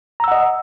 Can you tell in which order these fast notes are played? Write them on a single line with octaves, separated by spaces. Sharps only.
A#5 E6 F#5 D#5